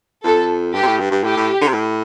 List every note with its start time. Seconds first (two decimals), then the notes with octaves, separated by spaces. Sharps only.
0.24 F2 A4
0.74 G2 G4
0.83 C3
0.87 A2
1.00 G2
1.11 G2
1.24 A2 G4
1.37 A2
1.62 D3
1.68 C3
1.73 A2